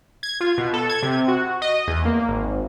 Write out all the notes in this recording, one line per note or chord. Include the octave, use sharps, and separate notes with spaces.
G#6
F4
B2
A4
G#6
C3
F#4
D#5
E2
A#3
G#1